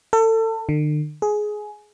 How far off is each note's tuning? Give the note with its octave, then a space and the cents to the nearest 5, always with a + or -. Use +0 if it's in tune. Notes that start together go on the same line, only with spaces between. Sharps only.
A4 +30
D3 +45
G#4 +15